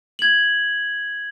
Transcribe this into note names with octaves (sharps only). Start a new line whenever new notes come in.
G#6 F#7